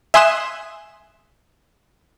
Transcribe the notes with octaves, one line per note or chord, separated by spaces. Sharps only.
E5 G#5 C6 D#6 F#6 E7